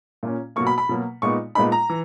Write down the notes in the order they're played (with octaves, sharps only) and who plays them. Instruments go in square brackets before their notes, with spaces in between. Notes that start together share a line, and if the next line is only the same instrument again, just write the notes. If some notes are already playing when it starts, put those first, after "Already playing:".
[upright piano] A#2 A#3 C#4
B2 F#3 A#3 C#6
B5
B5
B2 F#3 A#3
A#2 G#3 B3 D#4 C#6
A#2 G#3 B3 D#4 B5
A#5
E3